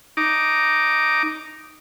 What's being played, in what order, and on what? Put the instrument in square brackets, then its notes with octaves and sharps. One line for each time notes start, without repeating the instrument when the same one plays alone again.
[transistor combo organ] D#4 D6